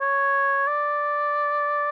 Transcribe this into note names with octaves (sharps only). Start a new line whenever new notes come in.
C#5
D5